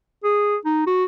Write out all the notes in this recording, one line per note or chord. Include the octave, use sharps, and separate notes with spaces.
G#4
D#4
F#4